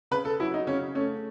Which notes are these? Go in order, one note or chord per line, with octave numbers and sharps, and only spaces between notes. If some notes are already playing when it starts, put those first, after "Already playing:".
C#3 B4
A4
F#3 E4
D#4
C#3 C#4
A3 C#4